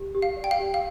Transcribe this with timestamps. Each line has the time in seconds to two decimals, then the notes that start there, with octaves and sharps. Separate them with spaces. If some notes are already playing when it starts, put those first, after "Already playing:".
Already playing: G4
0.15 G4
0.22 F5
0.37 D5
0.44 G5
0.51 F5
0.59 G4
0.74 F5